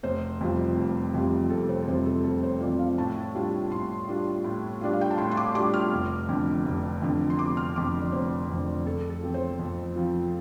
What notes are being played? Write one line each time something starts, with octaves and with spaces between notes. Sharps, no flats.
F1 C5
F2 C3 G3 F4
F1
F2 C3 G3 F4
F1 A4
C5
A4
F2 C3 G3 F4 C5
A4
F1 A4
C5
F2 C3 G3 F4 D5
F5
A2 A5
G3 D4 F4
A2 C6
G3 D4 F4
A2
G3 D4 F4 D5
F5
G5
A5
A2 C6
C6
D6
G3 D4 F4 D6
F6
F1
F2 D3
F1
F2 D3
C6
F1 D6
F6
F2 D3 D6
D5
F1 C5
F2 D3
F2 A4
A4
F3 C4 F4
C5
F2
F3 C4 F4